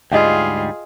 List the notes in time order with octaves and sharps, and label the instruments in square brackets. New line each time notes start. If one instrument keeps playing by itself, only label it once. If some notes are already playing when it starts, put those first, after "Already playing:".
[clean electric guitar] D2 G#2 G3 [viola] F4 G#4 [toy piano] D#5 F5 G5